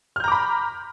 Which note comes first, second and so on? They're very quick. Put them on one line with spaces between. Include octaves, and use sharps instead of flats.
F6 G6 A#5 D6 B5